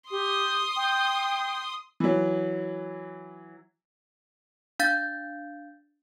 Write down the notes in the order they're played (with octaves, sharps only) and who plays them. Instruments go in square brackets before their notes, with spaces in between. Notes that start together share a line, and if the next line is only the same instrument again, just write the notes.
[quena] G4 [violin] C6 D#6
[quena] G5
[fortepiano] E3 F#3
[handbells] D4 F5 G6 A6